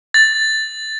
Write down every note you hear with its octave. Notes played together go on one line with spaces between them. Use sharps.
A6